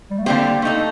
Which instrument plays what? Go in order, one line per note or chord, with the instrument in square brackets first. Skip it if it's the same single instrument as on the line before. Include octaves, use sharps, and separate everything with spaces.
[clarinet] G3
A3
[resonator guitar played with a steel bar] D3 G3 C4 G4 C5 [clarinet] A#3
[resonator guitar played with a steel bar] A3 D#4 A4